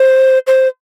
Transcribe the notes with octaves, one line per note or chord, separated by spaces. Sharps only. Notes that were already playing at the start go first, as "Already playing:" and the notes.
Already playing: C5
C5